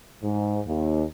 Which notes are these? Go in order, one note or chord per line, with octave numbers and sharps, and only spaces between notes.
G#2
D#2